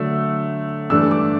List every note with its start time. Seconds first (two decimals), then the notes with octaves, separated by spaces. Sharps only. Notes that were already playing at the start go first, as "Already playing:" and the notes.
Already playing: D3 F#3 A3 D4 E6
0.90 G2 E3 A3 D4 E6
1.11 D6